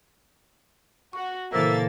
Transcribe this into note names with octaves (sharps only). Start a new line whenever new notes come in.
F#4 C#6
A#2 C#3 E3 A#3 A4 C5 E5 A6